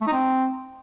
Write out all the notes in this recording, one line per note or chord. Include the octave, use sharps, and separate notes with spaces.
A3
D#4
C4